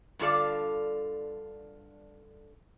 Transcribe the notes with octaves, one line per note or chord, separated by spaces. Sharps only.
G2 D3 F4 A4 D5